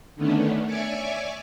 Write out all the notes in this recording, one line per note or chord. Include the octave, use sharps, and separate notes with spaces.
D3 D#3 A3 B3 C#4 D4
C#5 D5 E5 G#5 C#6 D6